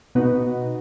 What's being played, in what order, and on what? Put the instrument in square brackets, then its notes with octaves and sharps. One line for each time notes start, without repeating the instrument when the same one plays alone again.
[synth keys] B2 B3 D#4 F#4